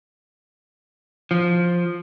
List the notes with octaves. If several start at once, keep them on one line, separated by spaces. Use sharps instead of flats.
F3